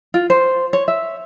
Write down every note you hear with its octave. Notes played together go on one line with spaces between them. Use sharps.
F4
C5
C#5
E5